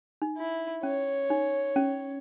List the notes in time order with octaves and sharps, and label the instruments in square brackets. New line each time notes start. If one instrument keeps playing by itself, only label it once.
[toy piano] D#4
[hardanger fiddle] E4
[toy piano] C#4 [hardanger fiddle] C#5
[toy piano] D#4
C#4